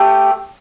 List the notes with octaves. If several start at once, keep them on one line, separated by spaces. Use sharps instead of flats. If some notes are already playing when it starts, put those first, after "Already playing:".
Already playing: A3 G4